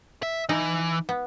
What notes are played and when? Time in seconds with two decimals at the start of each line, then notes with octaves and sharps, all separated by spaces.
0.23 E5
0.49 E3 D#4
1.09 B3